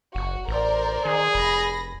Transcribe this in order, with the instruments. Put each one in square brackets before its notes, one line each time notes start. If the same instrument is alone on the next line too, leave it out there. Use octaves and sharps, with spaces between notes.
[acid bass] F#1 [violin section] F#4
[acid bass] A1 [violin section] A#4 C5 D5
[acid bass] D#3 [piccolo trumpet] G#4
[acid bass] F1 [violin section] B5 A#6